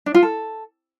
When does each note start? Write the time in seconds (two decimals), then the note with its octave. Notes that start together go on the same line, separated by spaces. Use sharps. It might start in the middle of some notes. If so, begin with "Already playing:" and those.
0.06 D4
0.14 F4
0.23 A4